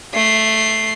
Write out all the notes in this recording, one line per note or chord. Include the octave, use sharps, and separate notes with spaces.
A3 C7